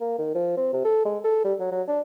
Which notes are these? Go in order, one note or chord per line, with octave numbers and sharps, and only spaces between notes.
A#3
D#3
F3
C4
C3
A4
G#3
A4
G3
F#3
F#3
D4